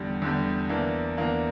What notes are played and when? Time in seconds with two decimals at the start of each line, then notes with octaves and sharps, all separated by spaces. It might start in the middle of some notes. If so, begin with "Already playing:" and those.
Already playing: E2 D3 G3
0.22 E2 D3 G3
0.69 E2 E3 A#3 D4
1.17 E2 E3 A#3 D4